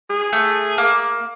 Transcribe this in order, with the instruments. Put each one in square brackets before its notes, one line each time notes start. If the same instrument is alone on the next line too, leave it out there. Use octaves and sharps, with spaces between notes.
[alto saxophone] G#4
[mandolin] A3
A#3